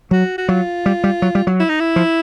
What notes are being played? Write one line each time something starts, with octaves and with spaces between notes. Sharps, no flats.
F#3 F#4
F#4
F#3 F4
G3
G3
F#3
G3
F#3
E4
D#4
E4
F3